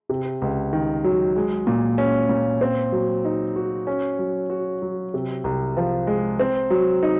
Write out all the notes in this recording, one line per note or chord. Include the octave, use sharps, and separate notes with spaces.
C3
C#2
D#3
F#3
G#3
A#2
C#4
A#2
C4
F#3
D#4
F#4
C#4
F#3
F#4
F#3
C3
C2
F3
G#3
C4
F#3
D#4